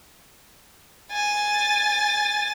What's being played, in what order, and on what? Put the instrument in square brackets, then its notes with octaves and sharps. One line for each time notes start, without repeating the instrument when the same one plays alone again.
[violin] G#5 A6